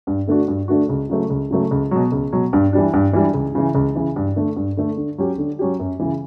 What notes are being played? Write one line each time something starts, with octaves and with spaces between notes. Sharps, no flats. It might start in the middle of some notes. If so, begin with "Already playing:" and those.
G2
D3 A3 D4 F#4
G2
D3 A3 D4 F#4
C#2
C#3 F#3 A3
C#2
C#3 F#3 A3
C#2
B2 F#3
C#2
B2 F#3
G2
E3 G3 D4
G2
E3 G3 D4
C#2
C#3 E3
C#2
C#3 E3
G2
D3 A3
G2
D3 A3
D3
F#3 C#4 G4
D3
F#3 C#4 G4
F#2
C#3 E3